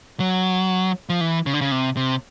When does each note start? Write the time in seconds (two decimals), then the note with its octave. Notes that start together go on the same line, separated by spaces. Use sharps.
0.20 F#3
1.09 F3
1.21 E3
1.46 C#3
1.54 D3
1.61 C#3
1.72 C3
1.97 C3